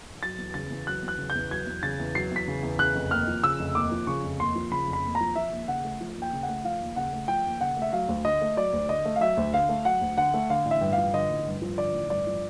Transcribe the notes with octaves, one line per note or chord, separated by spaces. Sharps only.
F#3 A6
E2
C#3 A6
E2
F#3 F#6
E2
F#6
C#3
G6
E2
F#3 G#6
E2
C#3 A6
E2
F#3 C7
E2 B6
C#3
E2
C#3 F#6
F1
D#2 F6
F3
C#3 E6
F1
D#2 D6
F3
C#3 C#6
F1
D#2 C6
F3
C#3 B5
F1
B5
D#2
A#5
F3
F3 E5
D#2
C#3 F#5
A3
F3
D#2
G5
C#3
F#5
A3
F3 F5
D#2
C#3 F#5
A3
F3 G5
D#2
C#3 F#5
A3
E5
F#3 F5
D2
D3 D#5
A3
F#3 D5
D2
D3 D#5
A3
F5
F#3 E5
D2
D3 F5
A3
F#3 F#5
D2
D3 F#5
A3
D3 F5
A1
E5
G2
F3 F5
D3 D#5
A1
G2
F3
D3 D5
A1
G2 D5
F3